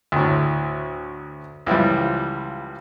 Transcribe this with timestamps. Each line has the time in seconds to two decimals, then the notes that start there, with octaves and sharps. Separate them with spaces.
0.12 D2 A2
1.66 C#2 E3 F3 G3